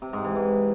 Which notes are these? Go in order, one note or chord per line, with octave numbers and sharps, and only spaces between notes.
C3
G#2
E3
G#2